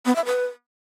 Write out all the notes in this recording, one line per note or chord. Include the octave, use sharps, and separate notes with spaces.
B3
E5
B4